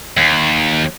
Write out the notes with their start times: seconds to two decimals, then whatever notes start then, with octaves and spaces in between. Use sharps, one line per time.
0.17 D#2